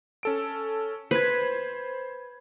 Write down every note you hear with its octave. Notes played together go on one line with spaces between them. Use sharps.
C#4 A4 D7
B4 C5 G#6